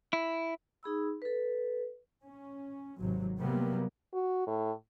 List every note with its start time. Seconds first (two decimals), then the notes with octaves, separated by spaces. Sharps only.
0.13 E4
0.83 D#4 G#4 B5 E6
1.22 A4 B4
2.24 C#4
2.98 G#1 C3 F#3
3.39 C3 F#3 G3 A#3 B3
4.14 F#4
4.47 A2